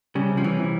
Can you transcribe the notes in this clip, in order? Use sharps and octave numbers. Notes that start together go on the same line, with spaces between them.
C#3 G3
C3
F3
E3 C#4
C3